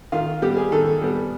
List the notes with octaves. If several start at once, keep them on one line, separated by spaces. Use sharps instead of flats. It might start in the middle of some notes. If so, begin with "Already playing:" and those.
D#3 F4
G3 B3 G4
G#4
D#3 A4
G3 B3